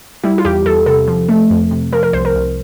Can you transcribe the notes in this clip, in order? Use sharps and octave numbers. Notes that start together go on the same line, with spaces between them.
G3 E4
F4
E2 G4
E2 A4
C3 A4
F3
A3
F2
C3
F3 A#4
A#4
C2 C5
A#4
C2